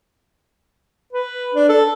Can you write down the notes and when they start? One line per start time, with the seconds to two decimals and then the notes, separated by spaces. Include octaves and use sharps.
1.13 B4
1.54 D4
1.69 A4